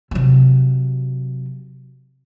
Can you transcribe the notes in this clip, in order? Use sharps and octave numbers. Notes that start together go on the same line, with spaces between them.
C3 F#3